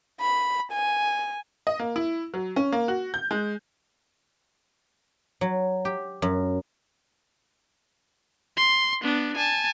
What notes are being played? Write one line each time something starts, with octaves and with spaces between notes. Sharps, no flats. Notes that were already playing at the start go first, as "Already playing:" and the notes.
B5
G#5
D#5
A#3
E4
F#3
C#4
A#3
F#4
G6
G#3
F#3
G4
F#2
C6
B3 D4
G#5 A5